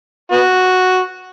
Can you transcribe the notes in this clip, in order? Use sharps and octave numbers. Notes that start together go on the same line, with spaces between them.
B3 F#4